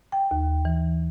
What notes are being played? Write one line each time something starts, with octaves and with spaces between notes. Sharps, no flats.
G5
D#2
E3